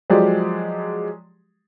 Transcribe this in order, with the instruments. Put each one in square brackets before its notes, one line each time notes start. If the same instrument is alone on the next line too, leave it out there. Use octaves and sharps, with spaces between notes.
[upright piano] F3 F#3 G#3 G4 D5